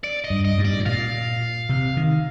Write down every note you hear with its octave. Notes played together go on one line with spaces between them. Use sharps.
D5
D#5
G2
D#5
G2
D5
A2
A#2 F5
C3
D#3